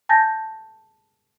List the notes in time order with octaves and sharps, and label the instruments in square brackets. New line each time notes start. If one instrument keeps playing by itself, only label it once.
[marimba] G#5 A5 G6 A6 A#6